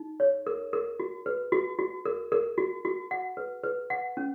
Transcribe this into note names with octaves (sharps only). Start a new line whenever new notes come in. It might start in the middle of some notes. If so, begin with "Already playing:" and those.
Already playing: D#4
C#5
A#4
A#4
F#4
B4
F#4
F#4
A#4
A#4
F#4
F#4
F#5
B4
B4
F#5
C#4